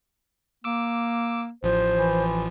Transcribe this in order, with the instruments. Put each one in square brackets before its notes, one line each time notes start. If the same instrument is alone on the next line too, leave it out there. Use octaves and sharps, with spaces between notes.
[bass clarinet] A#3 [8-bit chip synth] D6 E6
[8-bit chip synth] A1 F3 [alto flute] C5
[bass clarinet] E3